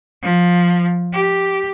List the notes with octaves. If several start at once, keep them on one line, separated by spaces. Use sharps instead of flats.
F3
G4